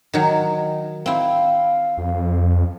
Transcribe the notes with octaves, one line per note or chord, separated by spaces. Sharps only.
D#3 F#3
C4 E4 F5
F2